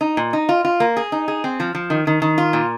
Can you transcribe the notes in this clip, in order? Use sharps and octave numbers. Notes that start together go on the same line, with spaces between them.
D#4
A#2
D#4
F4
F4
A#3
G#4
D#4
G#4
C4
F3
F3
D#3
D#3
D#3
F4
A#2